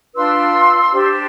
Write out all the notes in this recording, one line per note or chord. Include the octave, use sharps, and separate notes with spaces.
D4 F4 B4 C6 E6
D4 G4 C5